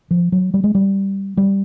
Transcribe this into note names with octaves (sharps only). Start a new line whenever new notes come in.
F3
F#3
G3
G#3
G3
G3